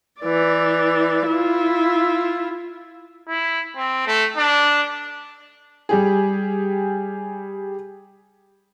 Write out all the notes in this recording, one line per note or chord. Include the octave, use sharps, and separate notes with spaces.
E3 D5
E4 F4
E4
C4
A3
D4
G3 G4 G#4